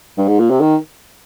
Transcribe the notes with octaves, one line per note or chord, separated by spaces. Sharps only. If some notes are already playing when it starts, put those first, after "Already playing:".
G2
G#2
A#2
C3
D#3